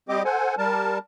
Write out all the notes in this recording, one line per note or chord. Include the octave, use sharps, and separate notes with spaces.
G3 C4 G4 D#5 D6
A4 C5 F#5 G#5
G3 A#4 A5